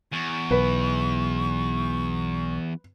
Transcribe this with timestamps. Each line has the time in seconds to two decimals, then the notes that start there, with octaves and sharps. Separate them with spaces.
0.13 E2 C#6
0.51 B1 B4